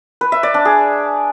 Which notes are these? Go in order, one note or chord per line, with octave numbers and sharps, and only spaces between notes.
B4
E5
D5
D4
G#4